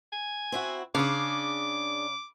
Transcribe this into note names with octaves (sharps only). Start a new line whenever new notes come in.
G#5
C4 E4 F#4
C#3 D4 G#4 D6